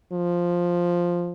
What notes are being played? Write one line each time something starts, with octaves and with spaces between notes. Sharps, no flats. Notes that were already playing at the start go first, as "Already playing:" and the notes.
F3